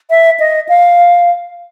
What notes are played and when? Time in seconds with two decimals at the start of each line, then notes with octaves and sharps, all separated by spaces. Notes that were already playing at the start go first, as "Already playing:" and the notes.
0.10 E5
0.40 D#5
0.69 F5